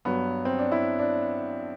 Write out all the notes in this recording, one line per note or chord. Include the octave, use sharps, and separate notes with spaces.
G2 F#3 B3
C4
D4
E4
D4